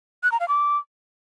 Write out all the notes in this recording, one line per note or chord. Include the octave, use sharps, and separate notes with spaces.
F#6
A#5
F5
D6